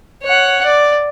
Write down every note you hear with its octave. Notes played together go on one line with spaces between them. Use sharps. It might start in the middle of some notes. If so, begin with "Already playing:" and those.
C#5 F#5
D5